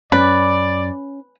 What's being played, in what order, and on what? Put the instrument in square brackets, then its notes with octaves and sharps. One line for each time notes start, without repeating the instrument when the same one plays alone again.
[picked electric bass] F#2 [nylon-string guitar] C#4 [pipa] B4 [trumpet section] D5